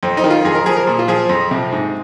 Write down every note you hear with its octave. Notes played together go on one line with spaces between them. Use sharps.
F2 C4
D#4
D#3
F4
F2 G#4
A#4
F3 G#4
A#4
A#2
F4
F3 G#4
F2
C3 F3
G#2